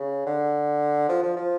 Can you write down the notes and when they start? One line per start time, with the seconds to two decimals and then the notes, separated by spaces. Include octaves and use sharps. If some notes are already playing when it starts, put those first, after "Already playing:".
Already playing: C#3
0.26 D3
1.09 F3
1.23 F3
1.37 F3